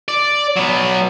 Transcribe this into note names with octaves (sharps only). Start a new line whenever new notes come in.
D5
F#3 B3